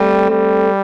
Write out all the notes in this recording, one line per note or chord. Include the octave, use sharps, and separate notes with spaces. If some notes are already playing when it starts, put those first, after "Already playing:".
Already playing: G3 A3 C4
G3